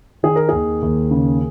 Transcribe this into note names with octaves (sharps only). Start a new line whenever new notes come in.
D#3 G#4
A#4
D#2 G#4
D#2
C#3